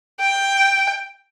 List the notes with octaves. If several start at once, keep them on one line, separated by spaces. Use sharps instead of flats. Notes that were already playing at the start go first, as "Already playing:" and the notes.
G5